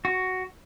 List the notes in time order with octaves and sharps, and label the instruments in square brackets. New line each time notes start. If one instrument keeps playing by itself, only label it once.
[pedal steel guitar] F#4